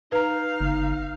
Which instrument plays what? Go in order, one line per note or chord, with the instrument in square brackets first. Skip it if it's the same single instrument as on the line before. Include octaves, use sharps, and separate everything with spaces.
[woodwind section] D#4 [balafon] B4 A#5 [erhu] F5
[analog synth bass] G1